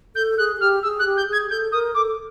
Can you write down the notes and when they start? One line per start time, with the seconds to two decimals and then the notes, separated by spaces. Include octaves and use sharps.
0.15 A4 G6
0.38 G#4 F#6
0.56 G#4
0.60 G4 F6
0.83 G#4 E6
0.99 F#6
1.05 G4
1.17 G6
1.27 G#4
1.33 G#6
1.50 A4 G6
1.72 A#4 D#6
1.95 A4 D6